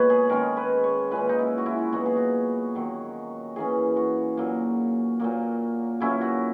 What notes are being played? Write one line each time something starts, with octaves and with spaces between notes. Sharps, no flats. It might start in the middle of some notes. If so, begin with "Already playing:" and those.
Already playing: A#2 G#3 B3 B4 C#5 D#5
G#4
D#3 G#3 C#4 A#4
B4
C#5
A#2 G#3 C#4 B4
D#4
E4
F#4
E4
A#2 F#3 B3 D#4 F#4
G#4
F#4
D#3 F#3 A#3
E3 A#3 C#4 G#4
F#4
A#2 F#3 A#3
A#2 F#3 A#3
C#3 F#3 A#3 C#4 E4
F#4